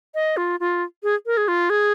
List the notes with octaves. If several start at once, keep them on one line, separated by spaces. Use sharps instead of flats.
D#5
F4
F4
G#4
A#4
G#4
F4
G#4